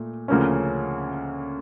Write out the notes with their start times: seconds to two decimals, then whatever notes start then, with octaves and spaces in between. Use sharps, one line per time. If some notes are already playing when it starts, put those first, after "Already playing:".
Already playing: A#2 A3
0.28 D2 C#3 F3 A#3 C#4